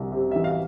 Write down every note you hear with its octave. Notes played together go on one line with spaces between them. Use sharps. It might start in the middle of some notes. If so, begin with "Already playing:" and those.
Already playing: C2 C3
C3
E3 E5
F5